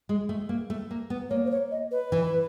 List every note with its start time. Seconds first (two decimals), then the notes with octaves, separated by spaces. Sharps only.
0.09 G#3
0.29 A3
0.49 A#3
0.70 A3
0.91 A#3
1.10 B3
1.30 A#3 C#5
1.46 C5
1.51 C#5
1.71 D#5
1.91 B4
2.12 E3